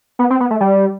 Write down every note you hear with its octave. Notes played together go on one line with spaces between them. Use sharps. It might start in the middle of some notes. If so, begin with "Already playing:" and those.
B3
C4
B3
A3
G3